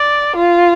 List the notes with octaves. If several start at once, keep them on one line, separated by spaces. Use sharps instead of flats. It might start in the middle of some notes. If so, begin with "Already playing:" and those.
Already playing: D5
F4